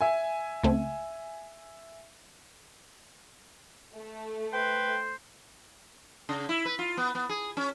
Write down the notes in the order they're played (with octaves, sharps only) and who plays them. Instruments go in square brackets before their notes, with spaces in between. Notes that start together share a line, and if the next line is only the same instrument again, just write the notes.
[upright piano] E5 G#5
[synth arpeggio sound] C#2 A3 C4
[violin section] A3
[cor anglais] B4 [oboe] C5 [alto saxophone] G5
[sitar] C#3
E4
B4
F4
B3
B3
G#4
C#4